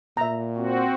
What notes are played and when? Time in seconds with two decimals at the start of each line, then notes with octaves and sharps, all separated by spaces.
0.17 A#2 E5 A#5
0.57 C4 F#4